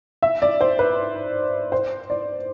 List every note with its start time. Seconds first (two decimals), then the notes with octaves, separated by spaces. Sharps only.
0.22 E5
0.42 D5
0.61 C5
0.79 B4
1.72 C5
2.10 D5